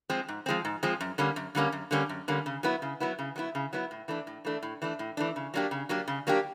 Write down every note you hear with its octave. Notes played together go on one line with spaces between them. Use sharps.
F3 G#3 C4
G#2
F3 G#3 C4
G#2
F3 G#3 C4
F#2
D3 G3 A#3 C#4
F#2
D3 G3 A#3 C#4
F#2
D3 G3 A#3 C#4
F#2
D3 G3 A#3 C#4
C#3
F#3 B3 E4
C#3
F#3 B3 E4
C#3
F#3 B3 E4
C#3
F#3 B3 E4
A2
E3 A3 D4
A2
E3 A3 D4
A2
E3 A3 D4
A2
E3 A3 D4
C#3
F#3 A#3 D4 G4
C#3
F#3 A#3 D4 G4
C#3
F#3 A#3 D4 G4